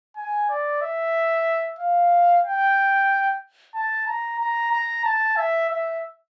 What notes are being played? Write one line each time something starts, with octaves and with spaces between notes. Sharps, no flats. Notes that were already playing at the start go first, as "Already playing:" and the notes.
G#5
D5
E5
F5
G5
A5
A#5
A#5
A#5
A5
E5
E5